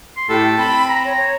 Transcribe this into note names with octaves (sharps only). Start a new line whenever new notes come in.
C6
A2 G4 A4
C4 B5
A#5
C#5
C#5